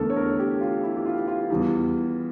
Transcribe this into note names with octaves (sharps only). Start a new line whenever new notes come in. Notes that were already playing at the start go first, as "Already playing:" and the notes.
Already playing: E2 D3 A3 A4 A#4
C#5
A#4
G4
F4
E4
G4
F4
F4
E2 E3 G3